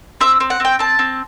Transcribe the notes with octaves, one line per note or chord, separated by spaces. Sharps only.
C4 E5
C4
F#5
C4 G5
C4 A5
C4